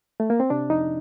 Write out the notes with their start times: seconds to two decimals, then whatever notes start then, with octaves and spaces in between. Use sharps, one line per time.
0.20 A3
0.30 A#3
0.40 C4
0.50 C3 D4
0.70 F2 D#4